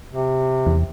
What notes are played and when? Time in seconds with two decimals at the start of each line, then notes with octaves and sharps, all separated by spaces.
0.13 C3
0.67 E2